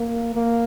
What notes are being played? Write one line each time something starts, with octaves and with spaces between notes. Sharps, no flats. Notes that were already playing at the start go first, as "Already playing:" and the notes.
Already playing: A#3
A#3